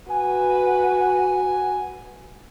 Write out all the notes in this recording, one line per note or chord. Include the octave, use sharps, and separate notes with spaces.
F#4 B4 G#5